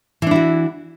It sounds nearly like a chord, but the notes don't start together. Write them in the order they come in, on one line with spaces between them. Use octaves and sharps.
E3 D4 E4 F#4